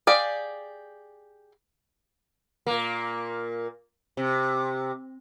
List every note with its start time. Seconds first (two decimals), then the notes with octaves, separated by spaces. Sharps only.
0.07 G4 G#4 D5 F5
2.67 A#2 A#3
4.17 C3